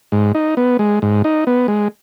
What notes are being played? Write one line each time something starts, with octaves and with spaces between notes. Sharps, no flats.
G#2
D#4
B3
G#3
G#2
D#4
B3
G#3